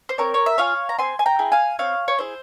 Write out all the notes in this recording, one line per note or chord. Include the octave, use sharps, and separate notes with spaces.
C5
C4 A#4 C#5
C#5
E5
F4 G#4 C#5 F5
A#5
C4 G#5 C6
G#5
G5 A#5
E4 G#4
F5 G#5
C4 C#5 F5
C#5
E4 G#4 C5